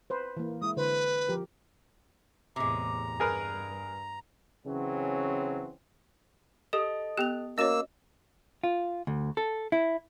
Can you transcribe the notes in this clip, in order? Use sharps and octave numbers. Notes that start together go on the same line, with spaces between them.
B4 C5
E3 A#3
G#3 E4 D#6
D3 B4 C5
F3 G4 A#4
E2 A2 C3 G#3 A#5
G2 G#4 A#4 B4
C#3 E3 F#3 C4 C#4
G4 A4 D#5 D#6
B3 G4 F#6 F7
A#3 C#4 F#4 C#5 D#5 E6 E7
F4
D2
A4
E4